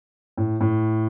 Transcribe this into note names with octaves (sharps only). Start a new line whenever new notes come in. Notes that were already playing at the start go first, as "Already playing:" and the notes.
A2
A2